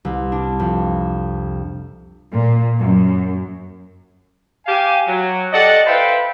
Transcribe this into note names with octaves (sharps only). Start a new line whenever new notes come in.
C2
D4
F2
A#2
F#2
G4 F5 G#5
F#3
G4 A4 D5 D#5 F#5
B4 C5 E5 F5 G5 B5